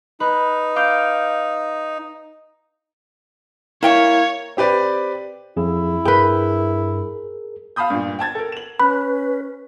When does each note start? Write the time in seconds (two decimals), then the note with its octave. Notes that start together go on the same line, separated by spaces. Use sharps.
0.20 D#4 B4
0.76 F5 D6 G6
3.83 A#3 E4 C#5 F5 G5 C#6
4.57 C4 G4 B4 D5
5.57 F2 E4 G#4
6.05 G2 G#4 A#4 B4 G5
7.76 F5 A5 B5 D#6 G6
7.90 G2 A#2
8.19 G5 A5 G#6 A6
8.35 A4 A#4
8.52 E7 F#7
8.80 C#4 B4 B5